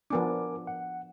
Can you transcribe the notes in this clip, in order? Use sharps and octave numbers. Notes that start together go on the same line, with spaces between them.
F3 B3 D4 A#4 G#5 D6
F#5